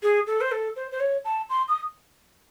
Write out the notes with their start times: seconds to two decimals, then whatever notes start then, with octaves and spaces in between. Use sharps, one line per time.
0.03 G#4
0.27 A4
0.41 C5
0.52 A4
0.76 C5
0.92 C5
1.00 C#5
1.25 A5
1.49 C6
1.68 D#6